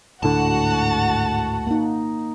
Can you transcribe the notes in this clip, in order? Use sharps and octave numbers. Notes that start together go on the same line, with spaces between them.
G#1 D2 A2 D3 F#4 F#5 A5
A#3 D#4